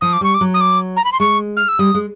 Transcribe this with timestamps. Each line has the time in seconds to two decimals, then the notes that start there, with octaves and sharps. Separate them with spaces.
0.01 F3 D#6
0.13 D6
0.21 G3 C#6
0.34 D6
0.41 F#3
0.54 D#6
0.61 D6
0.97 A#5
1.05 B5
1.12 C6
1.20 G#3 C#6
1.57 F6
1.68 E6
1.79 G3 D#6
1.94 G#3